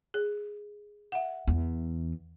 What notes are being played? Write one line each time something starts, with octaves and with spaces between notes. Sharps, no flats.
G#4
E5 F#5
E2